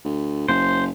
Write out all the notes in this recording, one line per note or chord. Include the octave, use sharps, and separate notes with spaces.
D2
F#1 C5